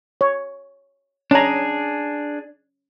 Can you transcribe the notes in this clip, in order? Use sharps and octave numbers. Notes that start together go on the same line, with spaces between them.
C#5
C#4 D4 G#4 A#5